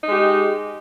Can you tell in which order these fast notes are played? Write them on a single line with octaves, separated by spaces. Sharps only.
D#4 G#3 G4